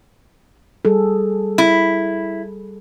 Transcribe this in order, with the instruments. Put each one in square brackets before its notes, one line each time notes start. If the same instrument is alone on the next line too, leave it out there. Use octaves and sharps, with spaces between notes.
[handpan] G3 G#4 A4
[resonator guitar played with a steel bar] E4